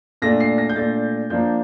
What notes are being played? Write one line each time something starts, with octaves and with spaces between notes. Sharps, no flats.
A#2 A3 D4 A#6
C7
A#6
G6
A#2 A3 D4 A6
F3 A#3 D4 G6